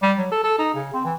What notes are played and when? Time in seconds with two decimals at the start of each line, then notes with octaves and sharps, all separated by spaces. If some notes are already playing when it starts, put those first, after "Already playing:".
0.03 G3
0.18 F#3
0.32 A4
0.44 A4
0.59 D#4
0.75 C#3
0.93 C4
1.05 E3